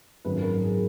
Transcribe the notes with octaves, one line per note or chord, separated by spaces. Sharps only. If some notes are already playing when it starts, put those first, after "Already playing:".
G#1 F#2 D#3 F#3 B4
A#4
G#4